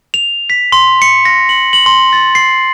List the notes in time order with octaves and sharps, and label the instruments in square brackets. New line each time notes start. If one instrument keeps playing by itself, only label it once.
[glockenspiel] F7
B6
C6
C#7
A#6
F#7
F#7
C6
A6
C7